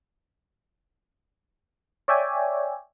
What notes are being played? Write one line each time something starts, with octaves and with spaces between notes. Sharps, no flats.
C#5 D5 E5 G5 G#5